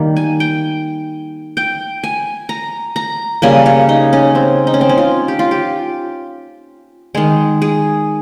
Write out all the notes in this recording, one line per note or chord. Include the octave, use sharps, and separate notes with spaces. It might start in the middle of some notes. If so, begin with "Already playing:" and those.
Already playing: D#3 G3 A#3
G#5
G5
G5
G#5
A#5
A#5
C#3 G3 A#3 G#5
C#5
D#4
C#4
C4
D#4
C#4
C4
C#4
F4
G4
F4
G4
D#3 G#3 G#4
G#4